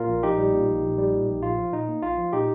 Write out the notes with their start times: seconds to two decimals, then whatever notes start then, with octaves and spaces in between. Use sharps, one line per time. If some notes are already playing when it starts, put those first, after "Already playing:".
Already playing: A#2 F4 A#4
0.08 A#1
0.23 A#1 D#4 G4
0.38 G3
0.53 A#2
0.68 A#1
0.83 A#1
0.98 G3
1.13 A#2
1.29 A#1
1.42 A#1 F4
1.58 F3
1.72 A#2 D#4
1.88 A#3
2.02 A#1 F4
2.18 F3
2.33 A#2 D#4 G4